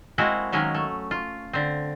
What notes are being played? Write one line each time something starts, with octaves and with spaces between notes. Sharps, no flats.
G#3 A#3 C4 E4 F#4
D#3 F#3 G#3 A#3 C#4
A3
F4
D3 C4